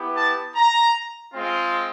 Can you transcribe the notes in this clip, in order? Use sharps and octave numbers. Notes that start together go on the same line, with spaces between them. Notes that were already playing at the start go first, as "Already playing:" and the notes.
Already playing: B3 E4 G4
A5
A#5
G#3 C4 F4